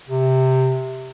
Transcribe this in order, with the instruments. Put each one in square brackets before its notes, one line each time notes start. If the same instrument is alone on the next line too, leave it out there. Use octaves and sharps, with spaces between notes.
[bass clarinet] C3